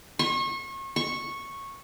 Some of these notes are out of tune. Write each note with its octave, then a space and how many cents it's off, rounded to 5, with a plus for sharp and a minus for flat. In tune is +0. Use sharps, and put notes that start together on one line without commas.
C#6 -35
C#6 -10